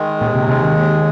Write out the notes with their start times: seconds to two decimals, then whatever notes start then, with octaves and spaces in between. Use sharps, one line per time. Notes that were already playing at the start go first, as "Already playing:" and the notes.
Already playing: D#3 G#3
0.21 D#2 A#2
0.35 C3
0.48 C3 G#3
0.63 D#3
0.77 D#2